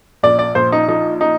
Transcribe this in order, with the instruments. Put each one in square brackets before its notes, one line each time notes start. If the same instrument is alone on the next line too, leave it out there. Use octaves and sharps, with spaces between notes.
[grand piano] A#1 D5
D5
A#1 C5
D#4
F3 D#4
D#4